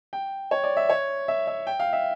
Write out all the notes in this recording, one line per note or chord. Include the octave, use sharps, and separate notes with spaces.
G5
C#5
D5
E5
C#5
E5
E5
G5
F5
E5